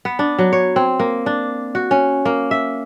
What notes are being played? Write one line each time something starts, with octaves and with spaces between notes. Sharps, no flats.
B3
D4
F#3
C#5
C4
A#3
D4
F#4
C#4
A#3
E5